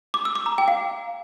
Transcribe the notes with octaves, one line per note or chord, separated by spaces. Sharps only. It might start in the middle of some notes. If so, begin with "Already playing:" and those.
D6
E6
D6
A#5
G5
F5